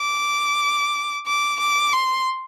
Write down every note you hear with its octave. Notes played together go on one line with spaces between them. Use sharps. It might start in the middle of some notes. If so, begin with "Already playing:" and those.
Already playing: D6
D6
D6
C6